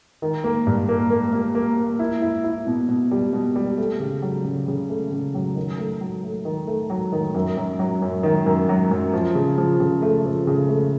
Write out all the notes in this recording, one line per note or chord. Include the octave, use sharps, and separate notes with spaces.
D#3
A#3
G2
A#3
A#3
A#3
A#3
A#3
E4
E4
E4
B2
B2
G3
B2
G3
A3
C#3
F#3
C#3
C#3
A3
C#3
F#3
D#3
A3
F#3
A3
D#3
A3
F#3
D#3
F#2
F#2
F#3
F#2
D#3
F#2
F#3
F#2
F3
C#3
F3
C#3
A3
F3
C#3
A3